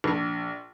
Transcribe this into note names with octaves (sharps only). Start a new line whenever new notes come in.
A#1